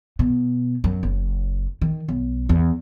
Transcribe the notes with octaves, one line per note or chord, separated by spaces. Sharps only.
B2
F#2
F#1
D#3
B1
E2